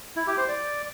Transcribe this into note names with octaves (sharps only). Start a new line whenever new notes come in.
E4
G4
C5
D5